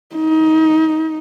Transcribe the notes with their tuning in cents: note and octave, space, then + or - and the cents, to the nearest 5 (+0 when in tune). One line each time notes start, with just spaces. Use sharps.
D#4 +25